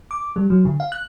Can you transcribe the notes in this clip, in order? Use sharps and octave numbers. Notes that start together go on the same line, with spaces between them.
D6
G3
F#3
D3
F5
F#6